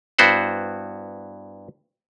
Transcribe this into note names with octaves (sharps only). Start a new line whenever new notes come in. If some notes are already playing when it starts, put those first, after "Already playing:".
G2 B3 E4 F#4 C5 F#5